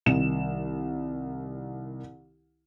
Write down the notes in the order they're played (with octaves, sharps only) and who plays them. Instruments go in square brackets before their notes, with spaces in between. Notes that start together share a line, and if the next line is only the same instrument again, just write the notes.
[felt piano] C2 D#3 E7